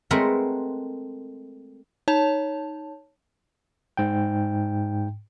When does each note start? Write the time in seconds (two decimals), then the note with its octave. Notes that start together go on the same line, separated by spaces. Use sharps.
0.11 G#3 A3 C4 A#4 B4 F#5
2.08 D#4 C#5 A5
3.97 G#2 G5